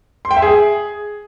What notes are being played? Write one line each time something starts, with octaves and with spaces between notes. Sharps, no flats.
C6
G5
E5
G#4